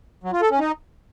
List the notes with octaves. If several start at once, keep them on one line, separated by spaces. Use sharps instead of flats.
F#3
F4
A4
C#4
D#4